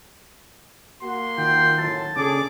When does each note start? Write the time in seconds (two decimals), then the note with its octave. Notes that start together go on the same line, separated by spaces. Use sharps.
1.03 A#3 F#4 C6
1.38 D#3 F4 G5
1.78 F#2 A2 A5
2.16 A#2 C#3 C#4 D4 G#4 A4 D6